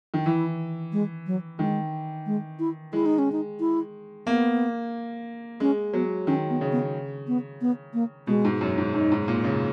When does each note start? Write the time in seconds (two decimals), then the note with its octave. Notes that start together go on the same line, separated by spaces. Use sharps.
0.14 D#3
0.25 E3 E4
0.93 G#3
1.26 F#3
1.59 D#3 G#3
2.26 G#3
2.59 E4
2.93 G#3 E4
3.06 D#4
3.19 C#4
3.32 D#4
3.60 E4
4.27 A#3 B3
5.60 G#3 C#4
5.93 F#3 B3
6.27 D#3 C#4
6.50 B3
6.61 C#3
6.72 B3
7.28 B3
7.61 B3
7.94 A#3
8.27 B2 G#3
8.45 G#2
8.61 F#2
8.78 G#2
8.94 F#2 D#4
9.12 G#2
9.28 A#2
9.44 C#3